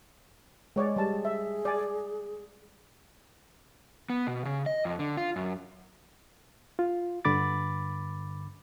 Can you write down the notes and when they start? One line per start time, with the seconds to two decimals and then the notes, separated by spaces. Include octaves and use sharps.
0.76 G#3 C#5 D5
0.96 G3 G#4 A5
1.25 E5
1.65 D5 G#5
4.10 B3
4.27 B2
4.45 C#3
4.66 D#5
4.85 F2
4.99 D3
5.17 F4
5.36 F#2
6.79 F4
7.25 G2 D3 B5 D6 A6